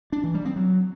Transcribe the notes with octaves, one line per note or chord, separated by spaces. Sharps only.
D4
E3
G3
C4
F#3